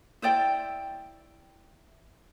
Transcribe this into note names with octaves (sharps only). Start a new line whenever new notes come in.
E4 C5 D5 G5